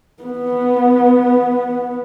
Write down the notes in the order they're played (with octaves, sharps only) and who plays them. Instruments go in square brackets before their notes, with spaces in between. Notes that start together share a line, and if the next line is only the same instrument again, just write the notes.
[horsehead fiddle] B3